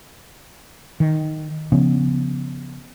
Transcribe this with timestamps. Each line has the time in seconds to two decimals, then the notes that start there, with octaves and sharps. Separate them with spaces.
1.00 D#3
1.72 C#3 F3 B3 C#4